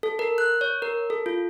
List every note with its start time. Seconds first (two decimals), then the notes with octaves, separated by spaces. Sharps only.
0.03 A4
0.19 A#4
0.38 F#6
0.61 C#5
0.82 A#4
1.10 A4
1.26 F4